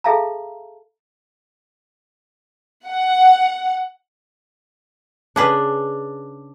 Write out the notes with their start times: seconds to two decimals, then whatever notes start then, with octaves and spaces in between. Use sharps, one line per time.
0.04 G#4 A4 E5 F5 A5 A#5
2.87 F#5
5.36 C#3 D4 G#4 B4